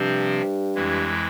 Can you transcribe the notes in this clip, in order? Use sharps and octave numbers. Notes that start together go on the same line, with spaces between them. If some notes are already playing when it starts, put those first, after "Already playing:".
Already playing: G2 C3 F3 C4
F2 E3 G#3 E4